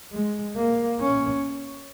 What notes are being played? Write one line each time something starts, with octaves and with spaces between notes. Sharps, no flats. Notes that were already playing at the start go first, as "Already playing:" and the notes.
G#3
A#3
C#4